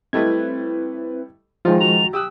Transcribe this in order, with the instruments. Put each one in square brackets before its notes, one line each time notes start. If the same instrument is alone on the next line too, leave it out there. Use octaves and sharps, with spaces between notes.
[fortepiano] G3 A3 D#5 [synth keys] C4 E4 B4 [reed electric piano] G#6
[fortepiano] D#3 D#4 F4 [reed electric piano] F3 G#3
[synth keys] F#4 A#5 [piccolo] F7
[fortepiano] G4 D#6 F#6 [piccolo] E6